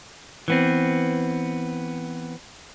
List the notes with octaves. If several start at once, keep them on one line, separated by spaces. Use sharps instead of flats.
E3 B3 C4